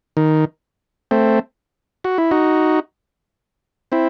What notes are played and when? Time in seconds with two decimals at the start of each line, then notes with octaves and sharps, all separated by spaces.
0.17 D#3
1.11 A3 C4
2.04 F#4
2.18 E4
2.31 D#4 F#4
3.92 C4 E4